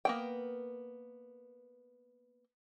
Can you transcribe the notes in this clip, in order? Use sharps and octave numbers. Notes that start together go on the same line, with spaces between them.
A#3 B3 G5